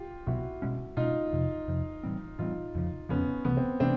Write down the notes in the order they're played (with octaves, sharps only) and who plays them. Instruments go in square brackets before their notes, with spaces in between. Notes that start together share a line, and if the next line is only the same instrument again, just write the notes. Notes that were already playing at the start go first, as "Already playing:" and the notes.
Already playing: [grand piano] F4 G4
[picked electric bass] C2 B2 F#3 B3 [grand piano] E4 F#4
[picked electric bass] B2 G#3 C#4
[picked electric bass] B2 G#3 C#4 [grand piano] D#4 F4
[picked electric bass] F2 C3 F3
F2 C3 F3
A2 E3 G3 C4
[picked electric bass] A2 E3 G3 C4 [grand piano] D#4 F4
[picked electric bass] F2 C#3 F3
[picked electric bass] F2 C#3 F3 [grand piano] B3 C#4
[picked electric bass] C2 C3 E3 A3 [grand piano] B3
[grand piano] C4
[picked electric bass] C3 E3 A3 [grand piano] C4 D4